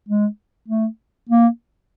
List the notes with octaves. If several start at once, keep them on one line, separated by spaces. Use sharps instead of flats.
G#3
A3
A#3